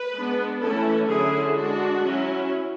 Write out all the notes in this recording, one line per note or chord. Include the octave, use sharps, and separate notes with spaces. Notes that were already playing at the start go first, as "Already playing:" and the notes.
Already playing: B4
G#3 B3 D4
E3 A3 C#4 E4 A4
D3 F#3 C#4 E4 G#4
G#3 D4 F#4
F#3 C#4 E4